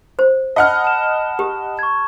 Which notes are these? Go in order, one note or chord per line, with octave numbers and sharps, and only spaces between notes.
C5
D#5 F#5 A5 B5 F6
A5 E7
G4
C#6 G#6